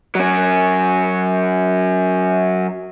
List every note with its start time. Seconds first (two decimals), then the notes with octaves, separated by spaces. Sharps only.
0.15 F#3 C#4